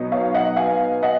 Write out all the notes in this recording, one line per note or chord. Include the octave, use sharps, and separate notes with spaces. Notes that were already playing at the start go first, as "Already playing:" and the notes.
Already playing: B2 F#3 B3 D#4
C#5 F5
D#5 F#5
F5 G#5
D#5 F#5